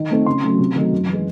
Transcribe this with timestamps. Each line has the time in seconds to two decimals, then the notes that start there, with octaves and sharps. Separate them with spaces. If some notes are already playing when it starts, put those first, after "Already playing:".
Already playing: D#3
0.11 A3 C4 D#4
0.26 C#3 C6
0.42 F#3 A3 C#4
0.59 C3
0.76 D#3 F#3 A3 D#4
0.92 F#2
1.08 E3 G#3